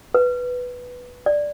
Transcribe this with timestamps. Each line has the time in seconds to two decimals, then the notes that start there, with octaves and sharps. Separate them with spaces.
0.15 B4
1.26 D5